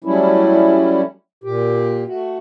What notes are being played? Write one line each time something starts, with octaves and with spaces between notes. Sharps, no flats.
F#3 G3 A3 C#4 E4
A#2 G4
A3 F#4